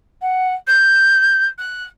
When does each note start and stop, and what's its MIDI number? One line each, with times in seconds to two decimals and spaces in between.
0.22 0.54 78
0.67 1.47 91
1.58 1.84 90